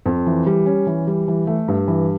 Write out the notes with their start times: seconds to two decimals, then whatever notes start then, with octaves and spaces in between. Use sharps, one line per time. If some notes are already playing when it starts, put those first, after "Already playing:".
0.06 F2
0.26 E3
0.46 G3
0.66 C#4
0.86 E3
1.07 G3
1.28 E3
1.47 A3
1.68 G2
1.88 E3